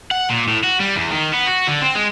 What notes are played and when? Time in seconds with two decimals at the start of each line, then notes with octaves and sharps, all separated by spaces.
0.11 F#5
0.30 A#2
0.48 A2
0.64 F#4
0.80 G3
0.96 E2
1.11 D#3
1.34 B3
1.47 F#4
1.68 D3
1.82 C4
1.95 G#3